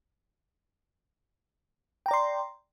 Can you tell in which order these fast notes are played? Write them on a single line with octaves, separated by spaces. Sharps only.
G5 A#5 D5 C6